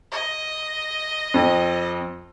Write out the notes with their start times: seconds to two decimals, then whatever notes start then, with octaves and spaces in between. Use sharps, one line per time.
0.12 D#5
1.34 F2